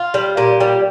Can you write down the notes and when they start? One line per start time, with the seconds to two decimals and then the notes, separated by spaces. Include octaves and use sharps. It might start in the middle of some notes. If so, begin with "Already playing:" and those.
Already playing: F4
0.14 G3
0.37 A#2 G4
0.60 G3